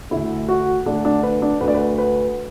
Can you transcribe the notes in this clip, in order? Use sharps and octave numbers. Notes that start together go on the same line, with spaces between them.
D2 D3 E4
F#4
D2 D3 D4
D4
B4
D4
D2 D3 B4
D5
B4
B4